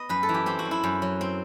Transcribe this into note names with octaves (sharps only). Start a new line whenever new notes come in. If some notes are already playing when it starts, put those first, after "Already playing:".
Already playing: B3 D#5
F#2 B4
A4
E3
G4
C4 G4
F#4
F#2
E4
F#2
F#3
C4